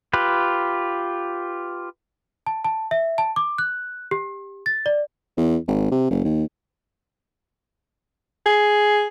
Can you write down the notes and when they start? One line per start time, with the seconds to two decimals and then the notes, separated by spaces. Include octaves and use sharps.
0.13 F4 G4 B4
2.46 A5
2.65 A5
2.91 E5
3.18 A5
3.36 D6
3.58 F#6
4.11 G4
4.66 A6
4.86 D5
5.37 E2
5.68 G#1
5.91 C3
6.11 F#1
6.25 D#2
8.46 G#4